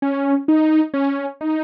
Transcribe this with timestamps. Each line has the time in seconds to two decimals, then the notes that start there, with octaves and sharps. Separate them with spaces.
0.02 C#4
0.48 D#4
0.94 C#4
1.41 D#4